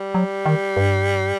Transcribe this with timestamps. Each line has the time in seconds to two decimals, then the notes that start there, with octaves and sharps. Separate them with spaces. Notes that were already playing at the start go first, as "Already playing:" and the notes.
Already playing: G3
0.15 F#3
0.46 D#3
0.77 G2